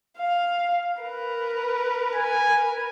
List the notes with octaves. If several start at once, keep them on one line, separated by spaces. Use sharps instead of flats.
F5
A#4 B4
G#5